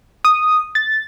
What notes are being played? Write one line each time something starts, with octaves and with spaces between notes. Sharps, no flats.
D#6
A6